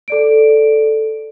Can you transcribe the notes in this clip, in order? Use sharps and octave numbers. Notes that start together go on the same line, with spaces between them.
A4 D5 D7